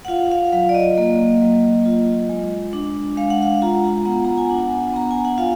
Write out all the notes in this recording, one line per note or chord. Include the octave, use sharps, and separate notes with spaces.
F#5
F4 F5
F5
F#3 F5
D5
D#5
A#3
F#3
F4
G#3
D4
G#3 F5
F#5
F5
F4 A#5
B3 F#5
A#5
G#5
D4 F#5
B3 A#5
G#5
F#5
F4 F5